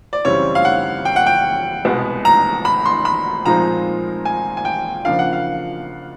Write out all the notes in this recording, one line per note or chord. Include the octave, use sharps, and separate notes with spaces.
D5
F#2 C#3 E3 G3 C4 C#5
F5
F#5
G5
F#5
G5
C2 B2 G#3 B3
A#5
B5
C6
B5
A#2 F3 G#3 C4 D#4 A#5
G#5
G#5
G5
C#3 F3 A#3 D4 F5
F#5
F5